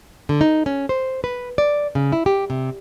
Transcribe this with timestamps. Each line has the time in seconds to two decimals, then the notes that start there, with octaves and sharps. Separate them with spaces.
0.29 D3
0.41 D#4
0.66 C#4
0.89 C5
1.24 B4
1.58 D5
1.95 C#3
2.12 E4
2.26 G4
2.50 C3